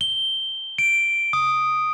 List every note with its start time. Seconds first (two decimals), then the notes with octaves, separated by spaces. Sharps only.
0.01 G7
0.78 D7
1.33 D#6